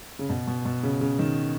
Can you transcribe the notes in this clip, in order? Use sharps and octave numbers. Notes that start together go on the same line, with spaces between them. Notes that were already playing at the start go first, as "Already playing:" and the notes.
C#3
B2
B2
B2
C#3
C#3
D#3